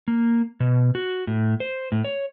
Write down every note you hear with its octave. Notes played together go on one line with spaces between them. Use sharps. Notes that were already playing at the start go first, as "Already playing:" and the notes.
A#3
B2
F#4
A2
C5
A2
C#5